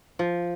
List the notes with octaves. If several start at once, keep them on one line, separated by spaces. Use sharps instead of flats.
F3